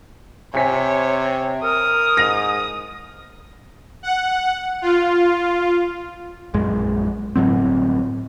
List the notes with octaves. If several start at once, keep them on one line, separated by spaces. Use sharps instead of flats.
C3 C5 C#5 G#5 B6
A#4 D#6
G#2 A#6 F7
F#5
F4
A#1 F#2 G#3
G1 A2 F#3 C4